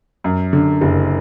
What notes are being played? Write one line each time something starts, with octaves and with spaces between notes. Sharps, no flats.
F#2
D3
F#1